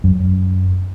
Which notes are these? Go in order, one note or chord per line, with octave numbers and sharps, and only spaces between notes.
F#2